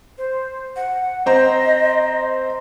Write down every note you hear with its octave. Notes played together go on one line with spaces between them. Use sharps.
C5
F#5
C4 C5 D#5 A#5